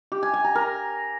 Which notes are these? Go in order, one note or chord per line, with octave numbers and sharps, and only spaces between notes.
G4
G#5
G#5
A#5
A#4